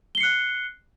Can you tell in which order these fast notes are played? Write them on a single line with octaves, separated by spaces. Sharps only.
G7 C7 C#7 F#6